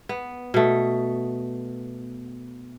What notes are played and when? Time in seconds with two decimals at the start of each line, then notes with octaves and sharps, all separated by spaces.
0.09 B3
0.54 B2 A3